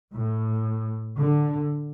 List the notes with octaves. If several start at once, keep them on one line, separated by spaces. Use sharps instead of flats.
A2
D3